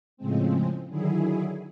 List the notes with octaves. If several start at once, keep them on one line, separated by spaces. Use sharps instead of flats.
A2 C#3 F3 G#3 C4
D3 D#3 F#3 E4 G#4